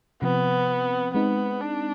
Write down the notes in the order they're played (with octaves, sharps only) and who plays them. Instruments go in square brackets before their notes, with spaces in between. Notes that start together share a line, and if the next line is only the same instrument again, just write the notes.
[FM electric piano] C3 F3 C4 [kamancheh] B3
[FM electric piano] G#3 C4 D#4 [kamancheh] B3
[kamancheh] D4